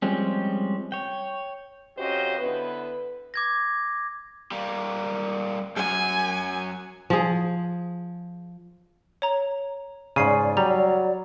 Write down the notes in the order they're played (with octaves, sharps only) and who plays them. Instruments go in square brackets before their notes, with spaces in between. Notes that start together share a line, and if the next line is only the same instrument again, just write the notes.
[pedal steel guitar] F3 G3 G#3 C4 C#4
C#5 G5
[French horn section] F2 C#4 F#4 G4 C5 D#5
D3 B3 E4 B4
[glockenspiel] D6 G#6 A#6
[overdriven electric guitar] G3 A#3
[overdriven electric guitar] F#2 F#3 [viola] G#5
[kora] F3 G#4
[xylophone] C#5 A#5
[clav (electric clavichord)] G#2 C#3 [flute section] D5 [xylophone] G#5 C7
[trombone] F#3 [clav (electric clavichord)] G3 [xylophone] A#5